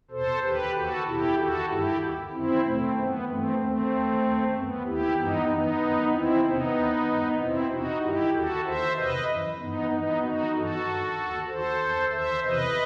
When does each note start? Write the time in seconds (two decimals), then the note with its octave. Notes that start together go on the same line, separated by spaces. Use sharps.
0.11 E2 B2 A4 C5
0.43 D#2 D#3 G4 B4
0.75 D#2 D#3 F#4 A4
1.06 E2 B2 E4 G4
1.37 E2 D#3 F#4 A4
1.69 G2 D#3 E4 G4
2.01 D#2 D#3
2.32 F#2 D#3 C4 E4
2.64 E2 B2 A3 C4
2.95 F#2 D#3 B3
3.28 G2 E3 A3 C4
3.58 D#2 D#3 A3 C4
3.90 D#2 D#3
4.23 D#2 D#3
4.53 F#2 D#3 B3
4.85 D#2 D#3 E4 G4
5.16 G2 E3 B3 D#4
5.48 F#2 E3 B3 D#4
5.80 F#2 D#3
6.11 E2 D#3 C4 E4
6.43 E2 C3 D#3 B3 D#4
6.75 D#2 D#3
7.07 G2 D#3
7.37 E2 B2 C4 E4
7.70 E2 B2 D#4 F#4
8.01 G2 D#3 E4 G4
8.32 D#2 D#3 F#4 A4
8.64 D#2 D#3 C5 E5
8.95 E2 C3 D#3 B4 D#5
9.27 F#2 E3
9.58 G2 E3 B3 D#4
9.90 G2 E3 B3 D#4
10.22 F#2 D#3 D#4 F#4
10.53 G2 E3 F#4 A4
10.85 G2 D#3
11.17 D#2 D#3
11.48 D#2 D#3 A4 C5
11.80 E2 D#3
12.11 D#2 D#3 C5 E5
12.43 E2 C3 E3 B4 D#5